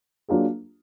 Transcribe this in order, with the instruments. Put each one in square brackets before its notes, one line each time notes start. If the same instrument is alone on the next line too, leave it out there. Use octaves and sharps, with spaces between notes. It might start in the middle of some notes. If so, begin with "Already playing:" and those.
[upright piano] F#3 A#3 D4 F4 G#4